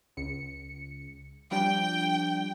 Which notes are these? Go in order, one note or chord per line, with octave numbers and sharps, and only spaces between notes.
C#2 C#7
F3 G3 D4 G5